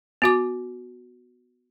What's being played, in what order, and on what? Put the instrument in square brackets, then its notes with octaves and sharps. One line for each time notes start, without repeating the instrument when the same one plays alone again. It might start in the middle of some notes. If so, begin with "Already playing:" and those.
[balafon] B3 F#4 D6